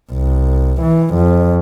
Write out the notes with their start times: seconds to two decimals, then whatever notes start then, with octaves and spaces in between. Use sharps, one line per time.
0.12 C2
0.82 E3
1.15 F2